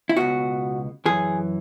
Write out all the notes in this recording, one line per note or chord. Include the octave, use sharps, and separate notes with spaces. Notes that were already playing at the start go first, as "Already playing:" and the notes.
E4
C#2 B2 F#4
F#2 E3 G#4